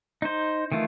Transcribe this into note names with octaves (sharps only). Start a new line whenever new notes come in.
D#4 C5
D#3 E3 A3 F4